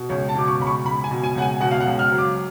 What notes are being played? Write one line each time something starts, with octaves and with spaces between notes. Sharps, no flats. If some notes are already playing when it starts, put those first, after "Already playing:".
Already playing: B2
C#2 C#5
A5
B2 D6
C#6
C#2 B5
C#6
C#2 B5
G#5
B2
G#5
C#2 F#5
G#5
B2 F#5
F5
F#5
C#2
F6
F#3
D6